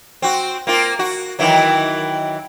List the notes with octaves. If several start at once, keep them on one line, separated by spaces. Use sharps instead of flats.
C4 F#4
A#3 C4 F4
F#4
D#3 E3 F#3